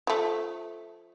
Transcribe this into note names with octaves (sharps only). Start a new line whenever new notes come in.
F3 A3